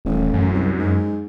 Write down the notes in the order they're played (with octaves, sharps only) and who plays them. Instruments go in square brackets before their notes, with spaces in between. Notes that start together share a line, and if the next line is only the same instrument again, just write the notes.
[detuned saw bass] D#1 [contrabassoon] A1
[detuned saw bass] F#2
[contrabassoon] C2
G#2